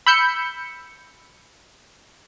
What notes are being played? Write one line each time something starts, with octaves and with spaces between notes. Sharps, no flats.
B5 E6 G6 C#7